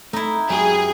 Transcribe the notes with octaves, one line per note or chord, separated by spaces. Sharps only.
A3 D#4 E4
F#2 F#3 G4 G#4